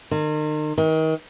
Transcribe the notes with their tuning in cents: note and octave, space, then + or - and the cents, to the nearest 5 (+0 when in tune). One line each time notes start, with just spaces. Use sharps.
D#3 -35
D#3 +35